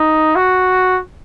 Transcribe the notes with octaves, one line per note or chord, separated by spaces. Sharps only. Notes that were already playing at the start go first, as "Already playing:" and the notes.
Already playing: D#4
F#4